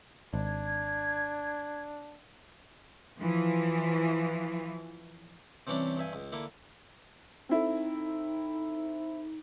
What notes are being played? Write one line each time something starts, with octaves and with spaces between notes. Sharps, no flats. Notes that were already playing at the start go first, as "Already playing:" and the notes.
G#1 D4 G#6
E3 F3
C3 E3 G3 C#4 D4
G2 E5 G#5
C#2
D3 A#3 E4
C4 D#4 E4 A4